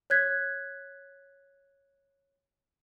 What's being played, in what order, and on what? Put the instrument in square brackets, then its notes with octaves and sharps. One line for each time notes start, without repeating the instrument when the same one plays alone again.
[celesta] C#5 F#6 G#6 B6